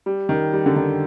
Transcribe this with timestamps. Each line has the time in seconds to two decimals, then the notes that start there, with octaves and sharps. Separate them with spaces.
0.06 G3
0.29 D#3
0.53 G3
0.66 D3
0.76 D#3